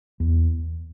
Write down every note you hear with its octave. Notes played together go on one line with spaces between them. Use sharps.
E2